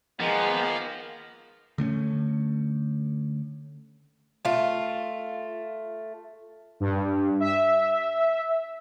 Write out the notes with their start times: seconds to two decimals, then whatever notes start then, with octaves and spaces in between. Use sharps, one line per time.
0.20 D#3 F3 G#3 A#3 B3 A#5
1.78 D3 A3 C4 C#4
4.45 A3 F4
6.80 G2
7.40 E5